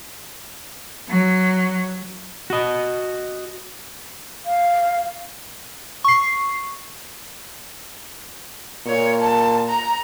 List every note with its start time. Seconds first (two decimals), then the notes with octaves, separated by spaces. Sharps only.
1.08 F#3
2.50 F#4 D#5
4.46 F5
6.04 C#6 C7
8.87 A#2 C#5
9.21 A5
9.69 A#5